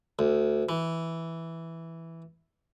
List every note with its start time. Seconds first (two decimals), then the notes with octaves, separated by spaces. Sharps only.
0.19 D2
0.69 E3